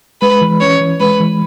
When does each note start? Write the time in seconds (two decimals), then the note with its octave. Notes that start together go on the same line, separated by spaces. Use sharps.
0.21 G#3 B4
0.41 E3
0.61 C#4 C#5
0.80 E3
1.00 G#3 B4
1.20 E3